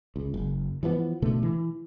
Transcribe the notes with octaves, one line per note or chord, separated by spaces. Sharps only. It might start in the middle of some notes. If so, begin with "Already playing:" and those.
C#2
F#1
E3 F3 G#3 B3
B2 D3 A3
E3